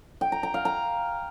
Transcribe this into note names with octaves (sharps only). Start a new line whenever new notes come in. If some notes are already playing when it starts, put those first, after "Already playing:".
G5
A#5
A#5
F5
A#5